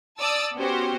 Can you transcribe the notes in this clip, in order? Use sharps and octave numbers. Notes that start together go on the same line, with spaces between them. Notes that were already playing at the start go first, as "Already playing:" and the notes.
D5 A5 D#6 E6 A6
B3 C#4 F#4 G4 C5